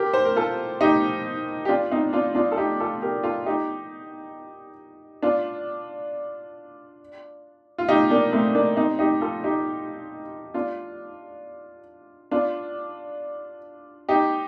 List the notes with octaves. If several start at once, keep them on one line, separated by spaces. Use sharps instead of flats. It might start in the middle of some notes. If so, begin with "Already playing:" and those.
Already playing: G4 A#4
C5
A#4
F4 A4
D#4 G4
G4
D4 F4
C4 D#4
D4 F4
D4 F4
A4
D#4 G4
F4 A4
G4 A#4
F4 A4
D#4 G4
D4 F4
F4
D#4 G4
A#3 D4
A3 C4
A#3 D4
C4 D#4
D#4 G4
F4 A4
D#4 G4
D4 F4
D4 F4
D#4 G4